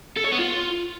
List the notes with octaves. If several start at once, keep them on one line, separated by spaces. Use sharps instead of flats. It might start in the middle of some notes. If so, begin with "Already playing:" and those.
A4
C#5
B3
F4